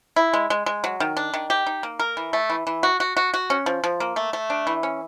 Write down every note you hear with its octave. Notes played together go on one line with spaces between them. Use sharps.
E4
G#3
G#3
G#3
F#3
D#3
D4
D#3
G4
D#4
A#3
A#4
E3
A3
E3
E3
F#4
F#4
F#4
F#4
C#4
F3
F3
A#3
A3
A3
D4
E3
C#4